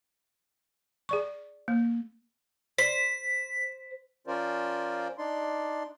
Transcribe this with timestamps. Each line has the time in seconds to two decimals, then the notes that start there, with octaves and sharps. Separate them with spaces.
1.09 G#4 D5 C#6
1.68 A#3
2.78 C5 B6
4.27 F3 C#4 F4 A#4 C5 D5
5.18 D4 D#4 D5 C6